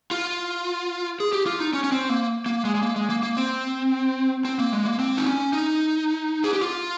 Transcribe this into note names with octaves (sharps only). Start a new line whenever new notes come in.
F4
G#4
G4
F4
D#4
C#4
C#4
C4
A#3
A#3
G#3
G#3
A#3
G#3
A#3
A#3
C4
C4
A#3
G#3
A#3
C4
D#4
C#4
D#4
G#4
G4
F4